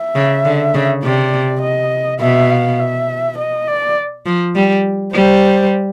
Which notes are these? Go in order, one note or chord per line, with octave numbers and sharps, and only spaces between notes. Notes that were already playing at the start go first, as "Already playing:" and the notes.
Already playing: E5
C#3
D3
C#3
C3 D5
D#5
B2 E5
F5
E5
D#5
D5
F3
G3
G3 C5